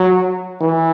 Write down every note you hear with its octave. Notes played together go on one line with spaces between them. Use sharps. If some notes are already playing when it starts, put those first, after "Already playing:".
Already playing: F#3
E3